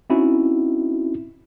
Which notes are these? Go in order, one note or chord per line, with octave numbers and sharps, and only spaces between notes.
C4 C#4 D#4 E4 F#4